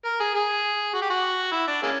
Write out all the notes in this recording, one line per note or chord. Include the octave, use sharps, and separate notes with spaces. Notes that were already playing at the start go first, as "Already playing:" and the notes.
A#4
G#4
G#4
F#4
G4
F#4
E4
D4
G#3 A#3 C#4